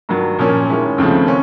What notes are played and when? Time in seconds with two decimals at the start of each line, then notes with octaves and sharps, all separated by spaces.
0.09 G2 D#3 F#3
0.39 A#2 F3 A#3 C#4
0.69 D#3 G#3 C#4 E4
0.98 D#2 C#3 F3 A3 C4
1.28 C#4